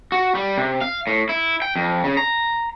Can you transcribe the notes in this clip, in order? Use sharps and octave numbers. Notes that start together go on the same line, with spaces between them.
F#4
G3
C3
F5
A2
E4
G5
F2
C#3
A#5